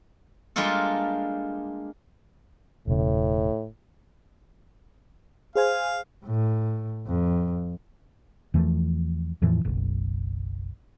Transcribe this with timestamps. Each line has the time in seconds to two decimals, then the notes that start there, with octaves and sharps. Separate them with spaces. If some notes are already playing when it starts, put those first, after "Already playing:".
0.56 G3 G#3 A#3 D4 F4 A4
2.87 E1 A2 C#3
5.55 G#4 C5 F5 G#5
6.25 A2
7.07 F2
8.54 E2 E3 F3 A3
9.42 E2 A2 E3 F3
9.65 F#1 B1